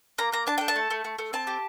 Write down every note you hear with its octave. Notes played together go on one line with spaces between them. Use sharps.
A#3 A#5
A#3 A#5
D4 A5
A4 G5
A5
A3
A3
A3
A3
C4 A5
G4